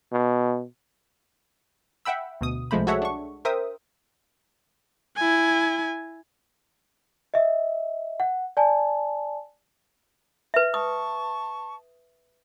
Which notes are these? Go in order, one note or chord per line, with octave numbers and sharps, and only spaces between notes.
B2
E5 F#5 G5 B5 E6
D2 B2 D#6
C2 F3 G#3 A3 C5 B5
F#4 G#4 A4 C#5 E5 F#5
D4 C#6
A#4 C5 E5 G5 D#6
E4 G#5
D#5 E5
F#5
D5 G#5 A5
B4 E5
A5 C#6 D#6